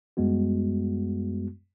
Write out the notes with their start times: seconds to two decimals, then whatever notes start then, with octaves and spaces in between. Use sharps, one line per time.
0.17 F#2 G3 G#3 B3 F#4